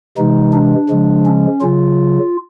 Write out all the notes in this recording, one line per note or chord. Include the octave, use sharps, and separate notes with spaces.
C3 E3 G#3 D#4
D4
C#3 F3 G#3
C#4
C#3 F#3 F4